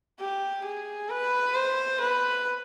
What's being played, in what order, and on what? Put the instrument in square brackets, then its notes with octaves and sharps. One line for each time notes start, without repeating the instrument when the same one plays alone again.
[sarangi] G4
G#4
B4
C5
B4